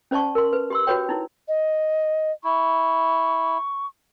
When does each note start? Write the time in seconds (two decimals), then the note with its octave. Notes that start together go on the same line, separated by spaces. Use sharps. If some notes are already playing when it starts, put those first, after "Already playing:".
0.11 C#4 C5 D5 A5 C#6
0.35 A#4 C6
0.53 B4
0.70 G4 C6 E6
0.87 F#4 G4 B4 C#5 G5
1.09 D#4 E4
1.48 D#5
2.44 E4 C#6